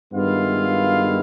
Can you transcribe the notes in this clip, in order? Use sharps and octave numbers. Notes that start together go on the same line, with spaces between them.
G2 D#3 G#3 B3 E4 F4 F5